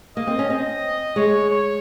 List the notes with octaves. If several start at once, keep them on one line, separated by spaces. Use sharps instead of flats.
A#3 D#5
C4
C#4
C4 D#5
G#3 C#5
C#5